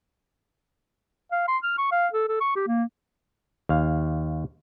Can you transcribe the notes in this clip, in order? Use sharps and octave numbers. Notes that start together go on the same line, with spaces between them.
F5
C6
F6
C#6
F5
A4
A4
C#6
G4
A#3
D#2 F5